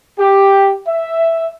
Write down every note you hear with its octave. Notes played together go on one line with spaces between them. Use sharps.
G4
E5